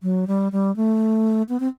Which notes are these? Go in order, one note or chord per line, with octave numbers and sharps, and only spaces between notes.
F#3
G3
G3
A3
B3
C4